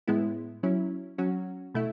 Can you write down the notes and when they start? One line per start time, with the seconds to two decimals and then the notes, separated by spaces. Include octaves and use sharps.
0.08 A2 G#3 B3 E4
0.63 F#3 C#4 E4
1.18 F#3 C#4 F#4
1.75 B2 A3 E4